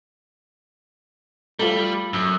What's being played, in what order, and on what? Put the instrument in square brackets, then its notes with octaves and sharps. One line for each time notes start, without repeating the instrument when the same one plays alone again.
[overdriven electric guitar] G3 [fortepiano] A3 F4
[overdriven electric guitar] F#2